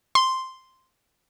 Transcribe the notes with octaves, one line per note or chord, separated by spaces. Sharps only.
C6